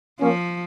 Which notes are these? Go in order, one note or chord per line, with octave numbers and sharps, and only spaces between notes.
F3 A#3 C#4